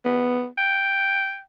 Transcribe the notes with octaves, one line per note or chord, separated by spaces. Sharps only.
B3
G5